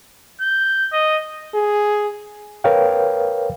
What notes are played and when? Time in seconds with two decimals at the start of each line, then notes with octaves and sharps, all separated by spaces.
0.41 G6
0.93 D#5
1.54 G#4
2.64 A#4 B4 C#5 F5 G5